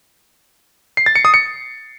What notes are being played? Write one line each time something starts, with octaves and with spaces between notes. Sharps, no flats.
C7
A6
C#7
D#6
C#7